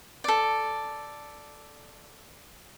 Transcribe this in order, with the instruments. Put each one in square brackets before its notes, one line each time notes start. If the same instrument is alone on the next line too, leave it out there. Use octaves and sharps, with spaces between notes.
[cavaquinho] A4 D5